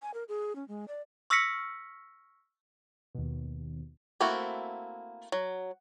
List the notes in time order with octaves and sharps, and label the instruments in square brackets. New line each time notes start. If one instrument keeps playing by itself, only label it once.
[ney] G#5
A#4
G#4
C#4
G#3
D5
[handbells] C#6 E6 F6 A#6 B6 C#7
[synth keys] D#2 B2
[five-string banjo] A3 A#3 C4 E4 F#4
F#3